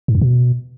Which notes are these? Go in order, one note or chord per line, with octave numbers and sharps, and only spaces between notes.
G#2
F2
B2